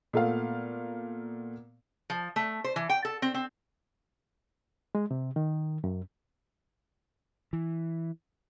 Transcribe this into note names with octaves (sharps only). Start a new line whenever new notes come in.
A#2 A3 B3 F5
F3
A3
C5
E3
G5
A4
C4
C4
G#3
C3
D#3
F#2
E3